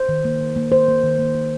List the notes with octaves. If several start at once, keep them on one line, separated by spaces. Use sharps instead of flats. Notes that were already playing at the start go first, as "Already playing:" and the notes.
Already playing: C5
D#3
A#3
D#3
A#3
D#3 C5
A#3
D#3
A#3
A#3